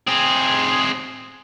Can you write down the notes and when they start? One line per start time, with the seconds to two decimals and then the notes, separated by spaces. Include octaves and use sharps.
0.07 C4 G#4